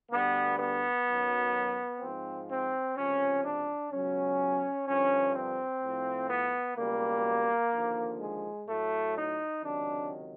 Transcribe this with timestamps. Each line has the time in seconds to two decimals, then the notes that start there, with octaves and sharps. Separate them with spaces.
0.11 D2 D3 G3 B3
0.58 B3
1.06 F#2 D#3 F#3
2.01 G#2 F3 C4
2.49 C4
2.96 C#2 C3 F3 C#4
3.43 D4
3.91 C#2 B2 F#3 C#4
4.86 G2 D3 F3 C#4
5.34 C4
5.82 A2 F3
6.29 B3
6.76 C#2 B2 G3 A#3
7.72 D#2 D3 F3
8.20 G#3
8.66 A2 F#3 A3
9.15 D#4
9.62 C#2 C3 D#3 F#3 D4